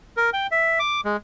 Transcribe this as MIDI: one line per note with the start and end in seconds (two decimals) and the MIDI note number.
0.17 0.30 70
0.33 0.47 79
0.51 0.79 76
0.79 1.01 86
1.05 1.17 56